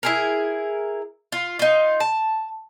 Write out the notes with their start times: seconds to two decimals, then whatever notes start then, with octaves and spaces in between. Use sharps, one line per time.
0.03 E4 G#4 A#4
1.32 F4
1.59 D#4 F4
2.00 A5